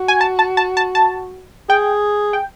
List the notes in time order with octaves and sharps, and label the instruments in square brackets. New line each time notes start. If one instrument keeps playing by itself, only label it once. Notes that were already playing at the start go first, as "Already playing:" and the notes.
Already playing: [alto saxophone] F#4
[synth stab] G#5
A5
A5
A5
A5
A5
[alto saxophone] G#4 [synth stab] G5
[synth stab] G5